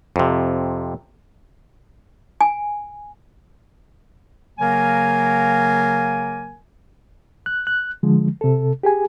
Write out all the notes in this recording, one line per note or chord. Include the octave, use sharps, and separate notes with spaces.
F2 C3
G#5
C#3 F#3 A#3 A#4 G#5
F#6
F#6
D3 F3 G#3
C3 A4
G4 G#4 G#5